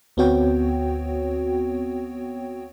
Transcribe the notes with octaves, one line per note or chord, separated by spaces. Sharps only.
D2 B3 C4 F#4 C#5 G5